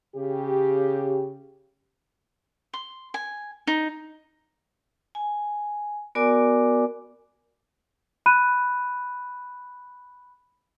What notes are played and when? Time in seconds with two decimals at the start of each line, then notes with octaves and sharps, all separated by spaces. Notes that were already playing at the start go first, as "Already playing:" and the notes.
0.15 C#3 G4
2.74 C6
3.14 G#5
3.67 D#4
5.15 G#5
6.15 B3 F#4 A#4 D5 G#5 D6
8.26 B5 F#6 D#7